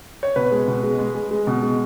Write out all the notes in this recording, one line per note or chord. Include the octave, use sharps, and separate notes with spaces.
C#5
B2 B4
G#3
B2
G#3
G#3
G#3
G#3
B2
G#3